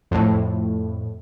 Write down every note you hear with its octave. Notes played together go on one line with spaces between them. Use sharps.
F2 A2